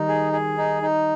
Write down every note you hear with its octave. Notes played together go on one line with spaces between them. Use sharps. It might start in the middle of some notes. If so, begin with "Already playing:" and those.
Already playing: D#3 G3 D#4
G#4
G#4
D#4
D#4